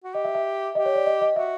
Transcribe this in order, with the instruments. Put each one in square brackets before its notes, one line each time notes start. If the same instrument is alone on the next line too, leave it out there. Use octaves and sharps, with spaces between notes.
[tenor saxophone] F#4
[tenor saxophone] G4 [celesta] D#5
[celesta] E5
E5
[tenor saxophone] G4 [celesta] D#5
[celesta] C#5
D5
D#5
D#5
[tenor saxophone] F#4 [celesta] E5